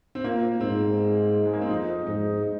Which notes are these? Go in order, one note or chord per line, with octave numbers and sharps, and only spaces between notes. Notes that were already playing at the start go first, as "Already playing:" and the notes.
C4
A#2 A#3
G#2 C4
G#3
A#3
C4
F2 D#4
G#2 D#4
D#4